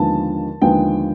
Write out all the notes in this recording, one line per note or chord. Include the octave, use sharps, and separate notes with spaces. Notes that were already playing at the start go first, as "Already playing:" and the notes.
Already playing: D#2 D3 F3 G#3 B3 A5
D#2 D3 F3 G#3 B3 G5